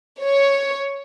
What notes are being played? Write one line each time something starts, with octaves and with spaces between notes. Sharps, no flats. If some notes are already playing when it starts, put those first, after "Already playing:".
C#5